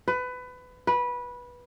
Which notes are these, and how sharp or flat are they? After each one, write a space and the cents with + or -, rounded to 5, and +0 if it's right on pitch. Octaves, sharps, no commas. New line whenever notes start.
B4 +20
B4 -15